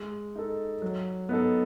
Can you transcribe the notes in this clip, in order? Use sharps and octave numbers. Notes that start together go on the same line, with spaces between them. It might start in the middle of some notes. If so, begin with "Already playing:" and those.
Already playing: G#3
D#4 A4
F#3
B3 D#4 A4